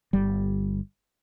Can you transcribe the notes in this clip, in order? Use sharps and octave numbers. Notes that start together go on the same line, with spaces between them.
G1 G3